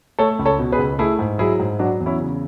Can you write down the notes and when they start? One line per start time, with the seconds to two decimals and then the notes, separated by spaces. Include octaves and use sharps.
0.19 A3 A4 C#5
0.39 C#2
0.46 A4 C#5
0.59 B2
0.72 G#4 B4
0.79 C#2
0.99 A3 E4 G#4
1.19 G#2
1.39 F#3 E4 G#4
1.59 G#2
1.79 F#3 D4 F#4
2.00 E2
2.06 C#4 E4
2.20 C#3